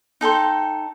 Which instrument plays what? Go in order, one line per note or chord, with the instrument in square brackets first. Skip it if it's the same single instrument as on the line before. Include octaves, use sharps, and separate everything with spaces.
[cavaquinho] D#4 A4 G5 C6